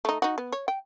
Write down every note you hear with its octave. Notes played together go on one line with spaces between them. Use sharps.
A3 D#4
D#4 F#4
B3
C#5
G5